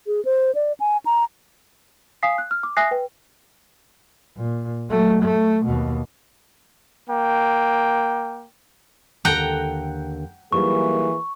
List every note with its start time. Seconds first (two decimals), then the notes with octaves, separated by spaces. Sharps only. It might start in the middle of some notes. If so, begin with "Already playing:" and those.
0.07 G#4
0.25 C5
0.55 D5
0.80 G#5
1.06 A#5
2.23 F5 G#5 D#6 B6 C7
2.38 F#6
2.51 F6
2.63 D6
2.77 E5 G#5 D#6 F#6 A#6 C7
2.91 B4 G5
4.36 A#2
4.89 F#3 A3
5.23 A3
5.66 D#2 B2
7.09 A#3 G5
9.25 D#2 D3 A4 F#5 G5 A#5
10.52 E3 F#3 G3 A#3 D#4 G#4 C#6